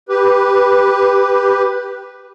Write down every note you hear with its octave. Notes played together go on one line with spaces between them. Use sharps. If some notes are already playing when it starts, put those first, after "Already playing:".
G4 B4